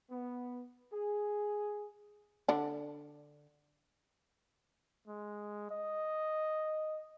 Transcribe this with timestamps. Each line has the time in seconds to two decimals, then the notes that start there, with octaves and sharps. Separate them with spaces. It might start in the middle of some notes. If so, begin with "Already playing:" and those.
0.11 B3
0.93 G#4
2.48 D3 D4
5.08 G#3
5.71 D#5